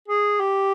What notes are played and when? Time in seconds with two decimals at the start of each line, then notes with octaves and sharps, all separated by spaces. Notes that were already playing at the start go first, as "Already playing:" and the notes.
0.08 G#4
0.40 G4